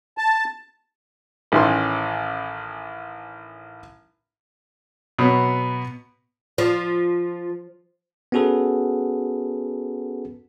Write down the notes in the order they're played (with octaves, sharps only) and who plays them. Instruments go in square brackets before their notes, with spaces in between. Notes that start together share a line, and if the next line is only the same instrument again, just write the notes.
[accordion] A5
[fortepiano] A1 D#3 E3 C#4 C6
B2 F#3 B3
[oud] F3
[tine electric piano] B3 C#4 F#4 G#4 A4 B4